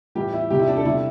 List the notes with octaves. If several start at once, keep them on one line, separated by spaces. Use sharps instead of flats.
A2 E3 G3 G4
E4
C3 G3 G4
E4
D4
A4
C3 G3 E4